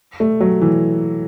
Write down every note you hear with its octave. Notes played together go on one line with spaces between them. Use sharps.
A3
F#3
E3